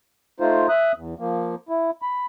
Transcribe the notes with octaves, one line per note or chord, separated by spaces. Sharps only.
A3 D#4 F4 C5
E5 D#6 F#6
E2
F3 A#3
E4
B5